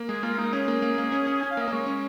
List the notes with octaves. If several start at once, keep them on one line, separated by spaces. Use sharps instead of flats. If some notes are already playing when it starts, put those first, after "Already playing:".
Already playing: A#3
G#3 G#4
A#3 F4
A#3 D#4
C#4 G#4
A#3
A#3
A#3
C#4
C#4
C#4 G#5
F5
A#3
D#5
A#3
G#3 C#5
C#4